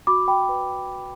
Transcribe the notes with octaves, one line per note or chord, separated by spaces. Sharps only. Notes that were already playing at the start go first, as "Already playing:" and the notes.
F#4 B5 D6
G5 B5
B4